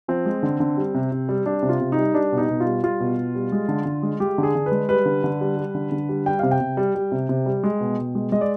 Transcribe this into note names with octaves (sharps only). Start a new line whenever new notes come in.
F3 C4
G#3
D3
D3
G3
C3
C3
G3
G3 D4
C3
F4
C3
G3 D#4
G3 D4
B2
D#4
B2
G3 F4
G3 F4
B2
B2
G3
G#3
D3
D3
G#3
G#3 G4
D3
G#4
D3
B4
G#3
G3 B4
D3
D3
G3
G3
D3
D3
G3
G3 G5
C3 F5
G5
C3
G3
G3
C3
C3
G3
G#3
B2
B2
G#3
G#3 D#5
D5